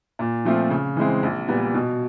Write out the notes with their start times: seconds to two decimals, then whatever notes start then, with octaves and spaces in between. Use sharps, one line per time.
0.19 A#2
0.45 F3 A3 C4 F4
0.70 C#3
0.97 E3 G#3 C4
1.23 A#1
1.48 A#2 G3 B3
1.74 B2